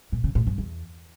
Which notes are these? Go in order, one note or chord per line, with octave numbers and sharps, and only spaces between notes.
A#2
C#3
A2
G2
E2